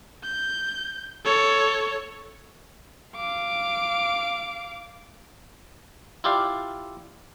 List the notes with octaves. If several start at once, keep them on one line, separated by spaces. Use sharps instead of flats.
G6
A4 C#5
F5 D6
E4 F4 G4 D5 F5